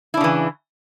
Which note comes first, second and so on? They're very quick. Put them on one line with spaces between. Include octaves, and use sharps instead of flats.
E4 D4 C#3 E3